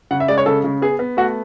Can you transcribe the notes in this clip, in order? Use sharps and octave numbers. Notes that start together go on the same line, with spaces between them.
C#3 F#5
E5
G#3 D5
C#5
C#3 A4
C#3
B3 G#4
B3
A3 F#4